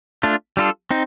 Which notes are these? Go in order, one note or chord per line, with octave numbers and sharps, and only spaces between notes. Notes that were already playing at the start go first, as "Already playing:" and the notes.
A3 D4 F4
G3 D4 F4 A4
C4 D#4